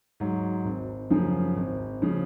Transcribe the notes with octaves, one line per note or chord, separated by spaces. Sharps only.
G#2 F#3
G#1
F#2 C#3 F3
G#1
C#3 F3